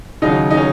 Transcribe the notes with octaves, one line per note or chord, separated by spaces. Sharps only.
D#2 C#3 F#3 D#4
D#4
C#4